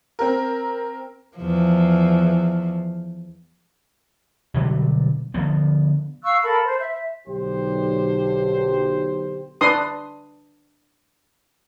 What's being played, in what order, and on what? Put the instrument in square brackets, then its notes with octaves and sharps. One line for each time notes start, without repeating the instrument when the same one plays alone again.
[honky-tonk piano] C4 A#4
[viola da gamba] E2 F3
[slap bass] B2 D3 F#3 G3
D3 F3 B3
[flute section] F5 C#6 E6 F#6
A4 A#4 B5
C5
E5
[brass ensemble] B1 D3 G4 C5
[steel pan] D4 B4 C6 D#6